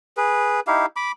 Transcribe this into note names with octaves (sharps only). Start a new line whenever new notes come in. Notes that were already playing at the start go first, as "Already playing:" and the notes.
G#4 B4
D#4 E4 G4 F5
B5 D6